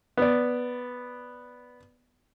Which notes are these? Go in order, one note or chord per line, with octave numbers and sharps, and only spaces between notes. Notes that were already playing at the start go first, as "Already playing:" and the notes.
B3 D5